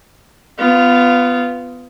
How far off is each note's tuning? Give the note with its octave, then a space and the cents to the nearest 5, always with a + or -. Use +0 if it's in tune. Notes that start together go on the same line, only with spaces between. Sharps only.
B3 +20 F4 -10